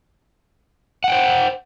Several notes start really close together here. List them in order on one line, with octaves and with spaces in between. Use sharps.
F#5 G5 C5